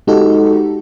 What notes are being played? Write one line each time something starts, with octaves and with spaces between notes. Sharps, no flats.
G#3 D#4 F#4 G4 A4